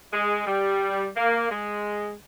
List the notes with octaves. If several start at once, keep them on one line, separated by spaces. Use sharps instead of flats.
G#3
G3
A#3
G#3